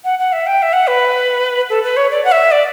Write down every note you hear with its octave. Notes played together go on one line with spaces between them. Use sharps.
F#5
F#5
E5
G5
E5
F#5
B4
A4
B4
C#5
D5
F#5
E5
D5